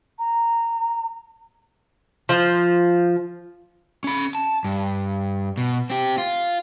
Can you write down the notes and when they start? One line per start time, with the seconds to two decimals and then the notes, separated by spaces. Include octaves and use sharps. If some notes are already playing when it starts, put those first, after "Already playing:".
0.19 A#5
2.29 F3
4.04 C#4 B5
4.35 A5
4.64 G2
5.58 B2
5.90 C4 G4
6.18 F4